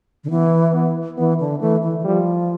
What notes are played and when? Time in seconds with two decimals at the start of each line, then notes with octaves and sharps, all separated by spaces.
0.24 D3
0.30 E3 B3
0.74 B3
1.18 E3 B3
1.40 D3
1.61 E3 A3
1.83 E3
2.00 E3
2.04 F3 G3